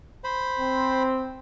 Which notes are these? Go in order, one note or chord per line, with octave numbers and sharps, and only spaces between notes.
C5 B5
C4